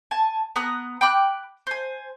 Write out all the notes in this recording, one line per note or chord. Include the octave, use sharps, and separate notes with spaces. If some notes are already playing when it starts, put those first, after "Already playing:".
G#5 A5
B3 A#5 D#6 F#6
G5 B5 D6 F#6
C5 G#5